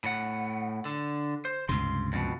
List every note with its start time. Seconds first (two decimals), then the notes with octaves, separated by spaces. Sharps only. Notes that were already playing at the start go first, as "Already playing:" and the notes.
0.04 A2 F#5
0.85 D3
1.45 C5
1.69 C#2 G2 C3 C6
2.13 F2 B2